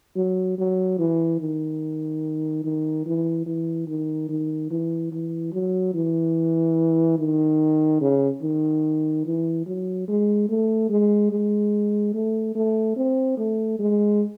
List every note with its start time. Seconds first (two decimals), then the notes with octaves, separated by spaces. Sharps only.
0.16 F#3
0.58 F#3
0.99 E3
1.40 D#3
2.64 D#3
3.06 E3
3.46 E3
3.87 D#3
4.29 D#3
4.70 E3
5.12 E3
5.53 F#3
5.94 E3
7.18 D#3
8.01 C#3
8.42 D#3
9.26 E3
9.66 F#3
10.08 G#3
10.49 A3
10.90 G#3
11.31 G#3
12.14 A3
12.55 A3
12.97 C4
13.38 A3
13.80 G#3